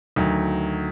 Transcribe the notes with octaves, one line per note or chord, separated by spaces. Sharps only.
D2 D#3 F#3